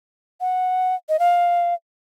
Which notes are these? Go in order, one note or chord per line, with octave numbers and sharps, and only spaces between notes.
F#5
D#5
F5